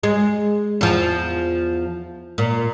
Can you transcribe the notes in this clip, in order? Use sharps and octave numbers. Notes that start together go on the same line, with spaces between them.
G#3
E2 F3
A#2